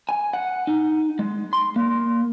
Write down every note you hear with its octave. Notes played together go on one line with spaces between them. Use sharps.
G#5
F#5
D#4
G#3
C6
A#3